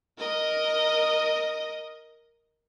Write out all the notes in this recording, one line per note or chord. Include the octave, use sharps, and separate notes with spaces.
A#4 D#5